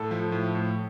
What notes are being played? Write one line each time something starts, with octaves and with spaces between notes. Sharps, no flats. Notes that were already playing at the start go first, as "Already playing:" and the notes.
Already playing: A2 A4
F3
A2
A2